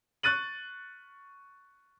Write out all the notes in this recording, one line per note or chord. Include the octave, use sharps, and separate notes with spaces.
C#6 F#6 A6 D#7 F#7